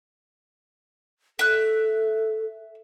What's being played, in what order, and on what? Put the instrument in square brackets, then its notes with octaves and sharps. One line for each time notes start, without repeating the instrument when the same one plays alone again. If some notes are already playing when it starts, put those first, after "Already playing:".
[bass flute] A4 [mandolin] E5 F#6